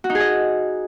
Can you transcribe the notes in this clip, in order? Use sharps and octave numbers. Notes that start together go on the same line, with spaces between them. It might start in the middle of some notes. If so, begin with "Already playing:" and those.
F#4
D#4
G#4
D#5